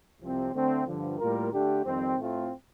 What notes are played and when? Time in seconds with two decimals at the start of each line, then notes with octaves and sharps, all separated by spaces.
0.21 C2 C3 F3 C4
0.54 D3 A3 C4
0.87 G2 D3 F3
1.19 A2 G3 A#3 F4 A#4
1.52 D3 A3 D4 G4
1.85 F2 D#3 G3 C4
2.18 A2 A3 C4 F4